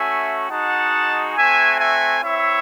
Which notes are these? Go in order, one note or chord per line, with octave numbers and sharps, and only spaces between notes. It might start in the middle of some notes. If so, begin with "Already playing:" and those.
Already playing: A3 C#4 F#4 E5 G#5
G#3 D#4 F#4 F#5 A5
A3 C4 F#4 E5 G#5
E5 G#5
C4 E4 C#5 E5